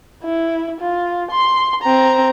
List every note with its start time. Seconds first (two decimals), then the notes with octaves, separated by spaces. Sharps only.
0.23 E4
0.80 F4
1.31 C6
1.82 C4 A#5